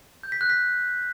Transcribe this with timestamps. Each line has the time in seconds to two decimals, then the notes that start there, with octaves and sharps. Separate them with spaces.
0.23 G6
0.32 B6
0.41 F#6
0.50 B6